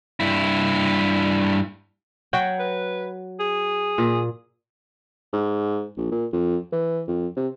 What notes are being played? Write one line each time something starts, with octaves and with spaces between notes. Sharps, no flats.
G2 E4
F#3 F#4 G5
B4
G#4
A#2
G#2
A#1
A#2
F2
E3
F2
C3